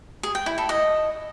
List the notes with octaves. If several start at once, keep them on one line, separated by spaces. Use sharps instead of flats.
G#4
G5
E4
A4
D#5